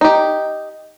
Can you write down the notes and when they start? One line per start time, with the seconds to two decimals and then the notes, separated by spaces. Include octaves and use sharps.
0.01 D#4 G4